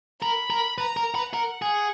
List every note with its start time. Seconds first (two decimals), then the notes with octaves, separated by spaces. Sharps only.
0.22 A#4 B5
0.50 A#4
0.78 B4 A#5
0.97 A#4
1.15 B4
1.34 A#4 F#5
1.62 G#4